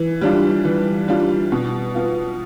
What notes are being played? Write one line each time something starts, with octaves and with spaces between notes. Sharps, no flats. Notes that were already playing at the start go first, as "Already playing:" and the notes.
Already playing: E3
G3 D4 F4
E3
G3 D4 F4
B2
B3 F4